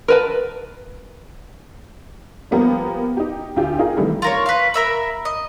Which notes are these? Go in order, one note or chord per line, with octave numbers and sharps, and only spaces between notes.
A#4 B4 A5
F3 G3 A#3 B3 G4 A#4
D#4 G4
D2 F4 G4
D#4 F4 G#4 A#4
C3 D#3 E3 G3 A3
F4 A#4 C#5
B4 F5
A#4 E5 B5
D#5